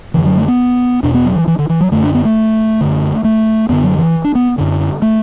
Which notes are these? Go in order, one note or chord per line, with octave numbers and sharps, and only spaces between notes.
F#2 D3 E3
F#3
A3
B3
E2 B2 D4
B3
F#3
E3
E3
D3
E3
F#3
F#2 D3 A3
D4
B3
A3
F#2 D3
A3
F#2 D3 B3
F#3
E3
D4
B3
F#2 D3
A3